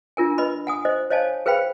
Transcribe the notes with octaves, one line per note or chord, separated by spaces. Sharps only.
D4 F4 A#4 G#5
B4 D#5 B5
F#5 G#5 D#6
C5 D#5
C5 C#5 D#5 F5 G#5 A5
G#4 B4 C5 F5 G5 B5